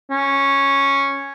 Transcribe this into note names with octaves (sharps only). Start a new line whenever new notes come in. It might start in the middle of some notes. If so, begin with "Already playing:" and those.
C#4